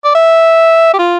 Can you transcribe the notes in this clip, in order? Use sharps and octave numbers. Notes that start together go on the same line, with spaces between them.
D5
E5
G4
F4